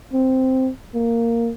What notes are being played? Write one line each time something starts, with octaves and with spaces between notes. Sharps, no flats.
C4
A#3